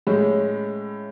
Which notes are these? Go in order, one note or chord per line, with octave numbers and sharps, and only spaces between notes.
A2 G#3 C#4